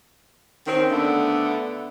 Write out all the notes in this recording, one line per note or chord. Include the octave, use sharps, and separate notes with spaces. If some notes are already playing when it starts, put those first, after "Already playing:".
D#3 C4 C#4
D3 A3 B3 A4